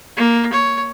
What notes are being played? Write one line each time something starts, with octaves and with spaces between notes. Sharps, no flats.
A#3
C#5